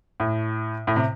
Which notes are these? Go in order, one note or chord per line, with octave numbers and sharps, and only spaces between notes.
A2
A2
C3